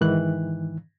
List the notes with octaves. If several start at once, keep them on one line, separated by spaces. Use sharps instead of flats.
G#2 D#3 E3 F#6